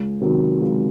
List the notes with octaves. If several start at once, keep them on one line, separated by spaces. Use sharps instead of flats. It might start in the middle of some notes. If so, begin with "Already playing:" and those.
Already playing: C#2
C3 D#3 F#3
C#2